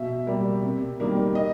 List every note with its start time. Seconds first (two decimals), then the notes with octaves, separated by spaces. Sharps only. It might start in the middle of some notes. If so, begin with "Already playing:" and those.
Already playing: B2 E5
0.27 G3 A#3
0.63 C3
1.00 D#3 G3 A#3
1.35 D#5